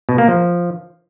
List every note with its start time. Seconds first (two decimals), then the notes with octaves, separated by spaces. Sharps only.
0.09 B2
0.18 A#3
0.28 F3